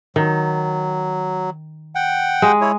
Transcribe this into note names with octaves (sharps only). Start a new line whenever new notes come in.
D#3 F#3
F#5 G5
G#3
E4 C#5